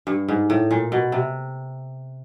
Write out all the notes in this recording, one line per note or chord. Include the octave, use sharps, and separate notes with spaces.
G2
G#2
A2
A#2
B2
C3